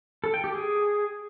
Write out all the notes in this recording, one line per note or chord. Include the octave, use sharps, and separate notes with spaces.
A4
G5
G4
G#4